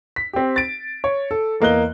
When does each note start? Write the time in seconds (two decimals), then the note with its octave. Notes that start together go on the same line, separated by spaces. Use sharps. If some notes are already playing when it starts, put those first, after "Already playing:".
0.16 B6
0.33 C4 G4
0.56 A6 D7
1.04 C#5
1.31 A4
1.61 E2 A#3 D#5 F#6 G7